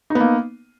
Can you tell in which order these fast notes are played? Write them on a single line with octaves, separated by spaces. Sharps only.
D#4 B3 A#3